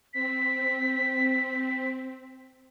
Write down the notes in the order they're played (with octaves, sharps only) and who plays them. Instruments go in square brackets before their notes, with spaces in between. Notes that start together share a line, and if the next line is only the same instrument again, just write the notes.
[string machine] C4 [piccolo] B6